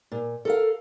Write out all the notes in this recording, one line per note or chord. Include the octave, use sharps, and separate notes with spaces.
A#2
A4 A#4 F5